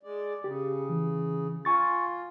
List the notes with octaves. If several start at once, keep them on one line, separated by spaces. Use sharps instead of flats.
G#3 D5
C#3 G4
E3
F4 G#5 C#6 A6